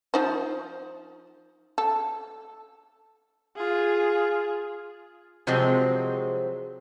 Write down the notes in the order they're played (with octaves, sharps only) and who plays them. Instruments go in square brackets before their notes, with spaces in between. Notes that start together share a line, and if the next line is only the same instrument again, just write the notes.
[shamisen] F3 D#4 C5
A4
[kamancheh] F4 G#4
[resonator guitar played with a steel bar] C3 F3 F#3 G#3 C4